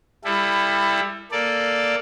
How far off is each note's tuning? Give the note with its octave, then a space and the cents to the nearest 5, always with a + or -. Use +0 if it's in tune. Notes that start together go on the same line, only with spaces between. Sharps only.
G3 +25 E4 +20 A4 +0
A#3 +0 A4 +0 D5 +0